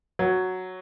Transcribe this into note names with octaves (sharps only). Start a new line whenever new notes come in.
F#3